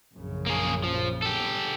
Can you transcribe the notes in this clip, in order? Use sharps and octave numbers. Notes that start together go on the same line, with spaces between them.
A#1 F#2 C#3
A#3 G#4
F3
G4 A4